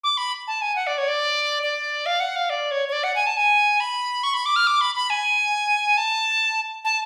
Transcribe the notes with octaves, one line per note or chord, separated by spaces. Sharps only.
D6
B5
A5
G#5
F#5
D5
C#5
D5
D5
F5
F#5
F5
D5
C#5
C#5
D5
F#5
G#5
A5
G#5
B5
C#6
B5
D6
F6
D6
B5
B5
G#5
A5
A5